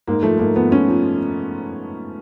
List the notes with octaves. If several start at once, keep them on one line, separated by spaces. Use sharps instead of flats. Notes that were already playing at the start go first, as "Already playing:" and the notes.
G#2 A#3
F3 A3
G#2 A#3
F3 B3
G#2 C#4
F3